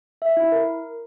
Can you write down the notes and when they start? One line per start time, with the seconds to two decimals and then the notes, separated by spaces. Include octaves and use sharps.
0.22 E5
0.37 E4
0.52 A#4